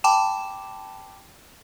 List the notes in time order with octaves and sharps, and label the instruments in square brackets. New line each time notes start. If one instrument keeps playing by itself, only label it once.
[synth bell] G5 A5 B5 D6 E7